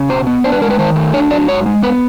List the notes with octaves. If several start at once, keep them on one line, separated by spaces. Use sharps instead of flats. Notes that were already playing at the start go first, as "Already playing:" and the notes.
Already playing: C#3
B2 C5
B3
D4 C5
B4
G#3 A#4
B4
D#3 C5
A3
D4 C#5
F#3 D5
G#2 C#5
G#3
B3 B4